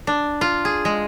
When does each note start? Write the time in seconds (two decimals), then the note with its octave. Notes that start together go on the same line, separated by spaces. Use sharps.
0.07 D4
0.41 F4
0.65 G#4
0.85 G#3